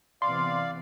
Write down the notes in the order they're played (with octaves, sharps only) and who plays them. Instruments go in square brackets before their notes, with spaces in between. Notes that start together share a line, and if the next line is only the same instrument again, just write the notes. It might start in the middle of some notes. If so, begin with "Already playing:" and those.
[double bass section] C3 E3 B3 [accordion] D5 F5 [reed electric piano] C6